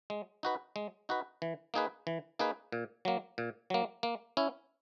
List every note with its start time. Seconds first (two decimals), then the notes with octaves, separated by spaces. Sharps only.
0.10 G#3
0.43 D#4 F#4 B4
0.76 G#3
1.09 D#4 F#4 B4
1.42 E3
1.74 A#3 D#4 G#4 B4
2.07 E3
2.39 A#3 D#4 G#4 B4
2.72 A#2
3.05 F#3 A#3
3.38 A#2
3.70 F#3 A#3
4.03 A#3
4.37 C#4 E4